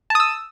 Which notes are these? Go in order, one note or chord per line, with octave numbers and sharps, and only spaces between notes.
A5 D#6 E6